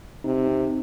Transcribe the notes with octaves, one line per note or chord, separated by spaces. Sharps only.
C3 D#4
C4